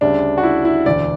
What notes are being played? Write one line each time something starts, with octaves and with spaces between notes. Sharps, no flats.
D2 C#3 G3 D4
F#4
E4
E4
E1 D2 D3 D5